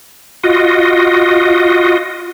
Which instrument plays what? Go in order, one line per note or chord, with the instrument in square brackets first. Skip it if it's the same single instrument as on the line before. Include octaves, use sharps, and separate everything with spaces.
[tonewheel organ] F4 F#4 D#5